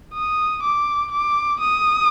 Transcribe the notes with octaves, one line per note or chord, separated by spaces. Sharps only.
D#6
D6
D6
D#6